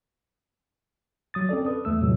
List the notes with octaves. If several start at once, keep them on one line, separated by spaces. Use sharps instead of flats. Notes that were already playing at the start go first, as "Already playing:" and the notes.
F#3 D#6 A6
C4 C#4 A4 D5
A4 B4 D#6
E2 A3 E6
A2 C3 F#3 G#3